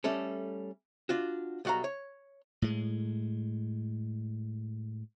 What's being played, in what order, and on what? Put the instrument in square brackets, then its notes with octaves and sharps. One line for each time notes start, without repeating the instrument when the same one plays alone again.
[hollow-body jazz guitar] G3 A3 C#4 A4
D4 F4 F#4
B1 G3 F#4 F5 A#5
C#5
[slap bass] A2 G#3